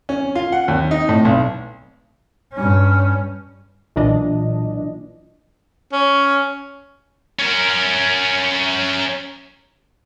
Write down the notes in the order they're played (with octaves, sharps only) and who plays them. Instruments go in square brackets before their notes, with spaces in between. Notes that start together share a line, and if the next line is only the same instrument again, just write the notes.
[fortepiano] C#4
F4
F#5
D#2
D#4
A2
B1
[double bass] G2 C#4
[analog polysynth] B1 A#2 E3 D4 D#5
[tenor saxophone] C#4
[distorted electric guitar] C#4 A#4